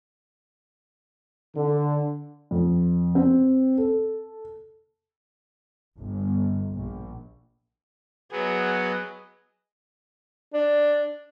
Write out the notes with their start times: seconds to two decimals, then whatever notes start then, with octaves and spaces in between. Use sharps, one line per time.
1.56 D3
2.51 F2
3.15 C4
3.78 A4
5.98 G1
6.73 A#1
8.32 F#3 B3 G#4 D#5
10.54 D4